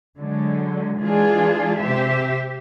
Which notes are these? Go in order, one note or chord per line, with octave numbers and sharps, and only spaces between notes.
D3 F#3 G#3
E3 G#3 D4 F4 G#4
C3 G4 C5 E5